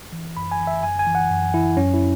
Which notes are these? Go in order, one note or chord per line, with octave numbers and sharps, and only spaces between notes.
E3
F#2 B5
G#5
E3
E5
F#2 G#5
G#5
E3
F#5
F#2
E3 E4
F#2 C#4
E4